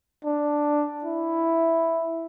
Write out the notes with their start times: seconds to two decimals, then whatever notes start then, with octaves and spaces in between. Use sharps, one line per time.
0.25 D4
1.04 E4